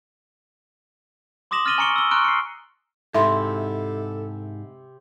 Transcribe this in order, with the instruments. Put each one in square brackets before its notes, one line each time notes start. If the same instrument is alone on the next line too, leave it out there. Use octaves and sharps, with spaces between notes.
[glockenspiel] C6 D6 D#6 A#6 E7 F#7
F6 A6 A#6 D#7 F#7 G7
G#5 A#5 C#6 C#7 D7 G7
E6 G7
A#5 C6 C#6 F6 F#6 D7
C7 C#7
[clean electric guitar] G#2 [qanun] C3 E4 [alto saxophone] A4 [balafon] E5 C6